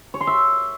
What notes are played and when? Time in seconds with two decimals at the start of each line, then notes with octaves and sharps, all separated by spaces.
0.14 C#5
0.21 C6
0.27 E5